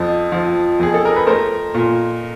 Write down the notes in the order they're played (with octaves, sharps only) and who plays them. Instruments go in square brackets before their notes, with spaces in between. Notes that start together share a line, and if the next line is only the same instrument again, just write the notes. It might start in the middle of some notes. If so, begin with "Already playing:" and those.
Already playing: [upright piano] F2 F3
F3
F2 G#4
A4
A#4
B4
A3 A#4 C5
A#2